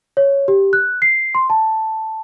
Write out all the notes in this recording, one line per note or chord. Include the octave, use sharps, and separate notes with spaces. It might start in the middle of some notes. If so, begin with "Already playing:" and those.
C#5
G4
F#6
C7
C6
A5